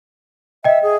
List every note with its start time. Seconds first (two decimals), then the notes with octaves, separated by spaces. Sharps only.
0.64 D#5 E5 G5
0.83 G#4